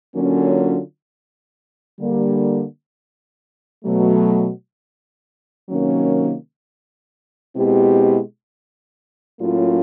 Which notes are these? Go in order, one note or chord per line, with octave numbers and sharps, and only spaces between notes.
D3 F#3 A#3 C#4 F4
D3 G3 A#3
B2 F#3 A3
C3 D#3 F#3 A#3 C#4
B2 G#3 C4 E4 G4
A2 F#3 A#3 C#4 F4